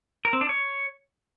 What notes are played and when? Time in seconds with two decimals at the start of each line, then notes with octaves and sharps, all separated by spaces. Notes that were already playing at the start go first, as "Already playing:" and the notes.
0.25 A#4
0.33 C4
0.41 D4
0.49 C#5